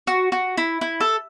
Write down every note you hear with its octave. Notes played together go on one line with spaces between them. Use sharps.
F#4
F#4
E4
E4
A4